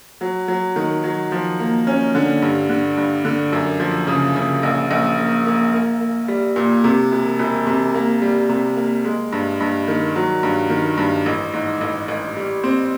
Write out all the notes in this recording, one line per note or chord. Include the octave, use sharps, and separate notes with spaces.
F#3
F#3
D#3
F#3
F3
A#3
C#4
D3
G2
D3
G2
D3
F#2
F3
C#3
C#3
A#1
A#1
A#3
A#3
A#3
A#3
G3
A#2
C3
E1
E1
C3
A#3
G3
C3
A#3
G#3
G2
G2
D#3
F#3
G2
D#3
G2
A1
G#2
A1
A1
G3
C4